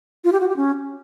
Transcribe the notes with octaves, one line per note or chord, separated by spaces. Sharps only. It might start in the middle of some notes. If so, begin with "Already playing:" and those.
F4
G4
F#4
G4
C#4